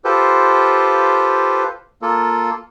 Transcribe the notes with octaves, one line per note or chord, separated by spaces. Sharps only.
F4 G4 A4 B4 C5
A#3 F4 A4